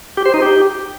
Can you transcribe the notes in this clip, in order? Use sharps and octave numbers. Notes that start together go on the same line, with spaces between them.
G4
C5
D#4
G4